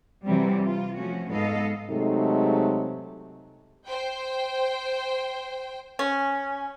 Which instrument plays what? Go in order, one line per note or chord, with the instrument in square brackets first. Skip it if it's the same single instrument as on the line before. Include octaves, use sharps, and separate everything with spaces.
[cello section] C3 E3 F#3 G3 C4
F4
F3 A3 C#4 F#4
G#2 B3 A4 D#5 F5
[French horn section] C3 F#3 G#3 A3 D#4 A4
[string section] C5 G5
[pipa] C#4